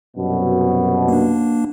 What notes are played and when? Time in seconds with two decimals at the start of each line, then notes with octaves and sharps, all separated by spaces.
0.16 C2 F#2 B2
1.08 A#3 D4